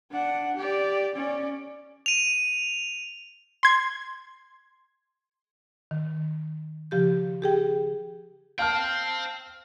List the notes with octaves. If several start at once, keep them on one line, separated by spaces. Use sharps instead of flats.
D4 F#5
G4 D5
C#4 D5
D#7 F7
C6 G#6
D#3
C#3 F3 G4 G6
G4 G#4 G5
C5 F5 G5 A5 F6